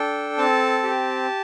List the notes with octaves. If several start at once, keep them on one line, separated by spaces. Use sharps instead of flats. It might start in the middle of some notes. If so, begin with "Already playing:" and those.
Already playing: D4 A4 G5
C4 A5
G4